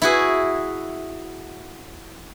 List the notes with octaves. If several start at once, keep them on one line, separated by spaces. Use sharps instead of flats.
E4 F#4 G#4